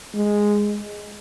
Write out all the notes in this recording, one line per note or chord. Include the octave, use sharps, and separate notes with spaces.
G#3